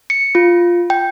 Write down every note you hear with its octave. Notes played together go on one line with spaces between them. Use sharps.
C#7
F4
G5